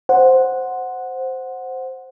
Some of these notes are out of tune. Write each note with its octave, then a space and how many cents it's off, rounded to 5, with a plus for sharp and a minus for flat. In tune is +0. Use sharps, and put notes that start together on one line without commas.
C5 +0 F#5 -5